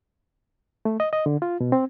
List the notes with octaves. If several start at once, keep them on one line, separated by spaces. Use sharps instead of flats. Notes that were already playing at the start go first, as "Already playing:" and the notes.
A3
D#5
D#5
D3
F4
B2
C4